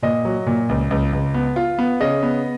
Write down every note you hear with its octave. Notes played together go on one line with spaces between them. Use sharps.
A#2 D#5
F#3
A#2
C#2
C#2
C#2
B3
F4
B3
C#3 D#5
B3